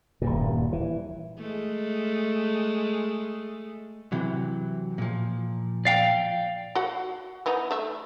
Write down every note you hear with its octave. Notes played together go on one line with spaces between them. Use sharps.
D#1 G2 A#2
E3
G#3 A3
C3 E3 F#3
A#2 F3
D5 F5 G5
F#4 F#5
E3 B3 D#4
A3 E5